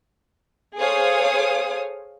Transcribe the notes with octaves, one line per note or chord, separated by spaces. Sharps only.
G#4 A4 C5 C#5 F5 D#6